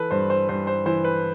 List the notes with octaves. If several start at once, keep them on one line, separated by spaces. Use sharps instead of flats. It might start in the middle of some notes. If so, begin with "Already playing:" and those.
Already playing: E3 A4 B4
G2 C5
C5
G2 C5
C5
E3 C5
B4